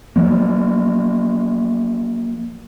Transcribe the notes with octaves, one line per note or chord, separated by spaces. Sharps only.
F3 F#3 A#3